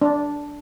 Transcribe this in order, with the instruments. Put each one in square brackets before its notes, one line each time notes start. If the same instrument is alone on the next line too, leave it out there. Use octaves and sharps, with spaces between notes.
[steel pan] D4